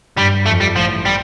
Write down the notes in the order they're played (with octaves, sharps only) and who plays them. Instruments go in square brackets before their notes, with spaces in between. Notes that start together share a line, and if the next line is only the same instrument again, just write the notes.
[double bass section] G2 [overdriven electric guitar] G3
[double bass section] F2 [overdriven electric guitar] A3
[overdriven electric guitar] G3
[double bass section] A1 A2 [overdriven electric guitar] F3
[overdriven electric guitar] G3